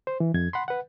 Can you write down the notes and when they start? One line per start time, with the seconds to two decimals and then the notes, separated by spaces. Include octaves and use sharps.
0.07 C5
0.20 E3
0.34 F2 G#6
0.53 F#5 B5 C6
0.68 B4 F#5